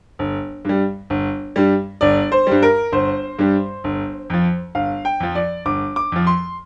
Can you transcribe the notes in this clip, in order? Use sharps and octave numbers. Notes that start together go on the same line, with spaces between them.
G1
G2 G3
G1
G2 G3
G1 D5
C5
G2 G3
A#4
G1 C5
G2 G3
G1
F2 F3
G1 F5
G5
F2 F3
D5
G1 D6
D6
F2 F3
C6